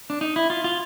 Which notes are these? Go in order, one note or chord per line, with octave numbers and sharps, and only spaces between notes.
D4
D#4
E4
F4
F4